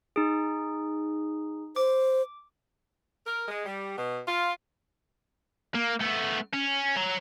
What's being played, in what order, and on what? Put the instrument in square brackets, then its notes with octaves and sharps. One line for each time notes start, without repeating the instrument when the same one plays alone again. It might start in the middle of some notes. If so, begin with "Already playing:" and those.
[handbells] D#4 G#4
[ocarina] C5 [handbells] D6
[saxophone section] A#4
G#3
G3
B2
F4
[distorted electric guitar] A#3
A3 B3
C#4
C#5 A#5